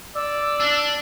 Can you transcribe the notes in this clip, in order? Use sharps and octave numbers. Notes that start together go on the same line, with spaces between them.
D5 E6
D4